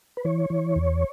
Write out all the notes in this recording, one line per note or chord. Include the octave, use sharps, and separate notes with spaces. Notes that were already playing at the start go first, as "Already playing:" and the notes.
B4
E3 C#5
E3
E2